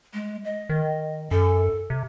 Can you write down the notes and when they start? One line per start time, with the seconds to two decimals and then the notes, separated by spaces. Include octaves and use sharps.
0.14 G#3
0.45 D#5
0.69 D#3
1.31 F#2 A4
1.90 C3